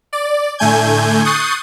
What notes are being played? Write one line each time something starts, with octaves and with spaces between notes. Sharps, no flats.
D5
A2 D3 A3 G#5 G6 G#6
C#6 D#6 F#6 G6 A6 C7